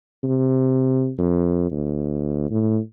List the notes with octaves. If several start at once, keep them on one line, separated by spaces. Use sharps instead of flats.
C3
F2
D2
A2